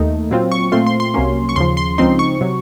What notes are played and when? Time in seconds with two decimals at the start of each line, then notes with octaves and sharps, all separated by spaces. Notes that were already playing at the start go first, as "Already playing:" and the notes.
Already playing: D#2 D#3 A3 D#4
0.30 A#2 F#3 C4 F4
0.51 C#6
0.72 A#2 A3 C4 F4 C6
0.86 C6
1.00 C6
1.14 C2 C3 F#3 A#3 C#4
1.49 C#6
1.56 D#2 C#3 F3 C6
1.77 C6
1.98 C#2 C#3 F3 C4 D#4 C6
2.19 C#6
2.41 C3 F#3